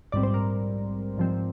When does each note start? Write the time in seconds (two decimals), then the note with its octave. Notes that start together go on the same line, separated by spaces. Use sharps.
0.12 A#1 G#2 G3 C4 D5
0.23 C5
0.34 A#4 D5
1.18 G#2 F3 C4